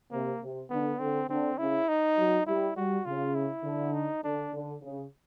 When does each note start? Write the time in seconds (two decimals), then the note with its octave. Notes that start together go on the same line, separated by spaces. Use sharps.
0.11 C3 A#3
0.41 C3
0.70 D3 B3
0.99 D3 C4
1.29 D3 C4
1.58 C#3 E4
1.88 D#4
2.17 F#3
2.46 G3 E4
2.76 G3 F#4
3.05 C#3 F4
3.35 E4
3.64 D3
3.93 D#4
4.24 D3 D4
4.53 D3
4.82 C#3